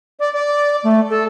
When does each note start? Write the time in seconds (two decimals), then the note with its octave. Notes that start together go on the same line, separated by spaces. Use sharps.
0.20 D5
0.33 D5
0.84 A3
1.10 A4